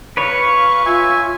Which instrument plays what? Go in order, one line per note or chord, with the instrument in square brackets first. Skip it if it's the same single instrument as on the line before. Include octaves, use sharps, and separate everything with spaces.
[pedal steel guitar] B4 C#5 [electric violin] F5 C#6
[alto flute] F4 [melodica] E5 G#5